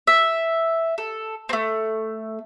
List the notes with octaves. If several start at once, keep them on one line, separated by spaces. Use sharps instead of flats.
E5
A4
A3 C4